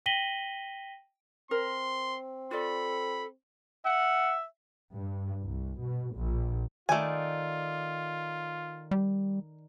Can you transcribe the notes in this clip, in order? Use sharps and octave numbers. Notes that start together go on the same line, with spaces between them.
G5 A#6 B6 D#7 F#7 G7
C4 A#4 C6
F4 A4 D5 B5
E5 F#5
G2
C2
B2
A#1
D#3 A3 F4 D5 G#5
G3